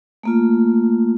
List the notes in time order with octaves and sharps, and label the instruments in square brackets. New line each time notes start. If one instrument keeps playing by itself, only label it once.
[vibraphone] A3 A#3 F4